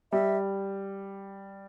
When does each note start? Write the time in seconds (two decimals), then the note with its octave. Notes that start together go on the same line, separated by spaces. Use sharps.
0.12 G3 E5